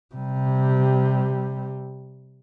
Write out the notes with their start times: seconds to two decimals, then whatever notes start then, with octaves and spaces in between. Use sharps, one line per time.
0.15 C3 G3